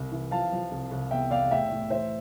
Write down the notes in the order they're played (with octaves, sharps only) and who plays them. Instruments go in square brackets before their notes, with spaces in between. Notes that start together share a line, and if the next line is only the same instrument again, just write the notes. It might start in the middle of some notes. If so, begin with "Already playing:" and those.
Already playing: [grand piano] C2
E3
F3 F5 A5
F3
C2
C2
E2 E5 G5
E2 D5 F5
A2 E5 G5
A2
E3 C5 E5